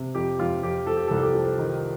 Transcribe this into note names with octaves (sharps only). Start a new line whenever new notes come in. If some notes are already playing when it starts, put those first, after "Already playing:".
Already playing: C3
F2 G4
F2 F4
F2 G4
F3 A4
G4
A4
C2
A4
G4
F3
D#3